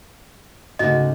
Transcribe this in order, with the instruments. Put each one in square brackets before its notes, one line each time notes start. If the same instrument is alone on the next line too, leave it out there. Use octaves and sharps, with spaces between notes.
[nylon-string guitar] D2 G#2 F#4 [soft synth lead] C#3 [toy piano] D#5